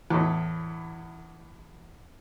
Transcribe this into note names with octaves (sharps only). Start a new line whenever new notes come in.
E2 A2